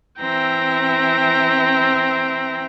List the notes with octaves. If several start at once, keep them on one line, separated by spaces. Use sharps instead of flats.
E3 C4 E5 G5 A#5 A#6